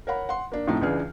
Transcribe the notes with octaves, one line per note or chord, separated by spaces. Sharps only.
A#4 C#5 F#5 B5
F#5 C6
A#3 D4
A2 C3 F3 A3 D#4
C#2 C#3 E3 D4 G#4 F6